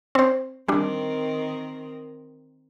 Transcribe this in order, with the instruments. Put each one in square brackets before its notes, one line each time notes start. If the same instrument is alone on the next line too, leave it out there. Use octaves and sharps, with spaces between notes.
[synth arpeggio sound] C4 C5
[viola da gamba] D#3 C4 A#4 [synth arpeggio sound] G3 D4